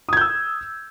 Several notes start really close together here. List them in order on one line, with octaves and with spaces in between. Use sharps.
D#6 G#6 G6 E6